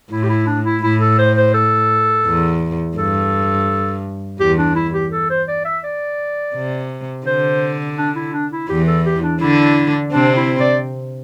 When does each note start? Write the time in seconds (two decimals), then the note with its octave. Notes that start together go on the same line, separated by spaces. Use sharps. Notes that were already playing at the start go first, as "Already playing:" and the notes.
0.11 A2 E4
0.23 G4
0.29 E4
0.47 D4
0.65 E4
0.83 A2 E4
1.01 A4
1.19 C5
1.37 C5
1.54 A4
2.26 E2
2.97 G2 A4
4.40 E2 G4
4.58 D4
4.76 E4
4.94 G4
5.12 A4
5.30 C5
5.48 D5
5.65 E5
5.84 D5
6.55 C3
7.26 D3 C5
7.98 D4
8.16 E4
8.34 D4
8.52 E4
8.69 E2 E3 G4
8.87 A4
9.05 G4
9.23 D4
9.41 D3 D4 E4
10.12 C3 C4 D4
10.37 E4
10.60 D5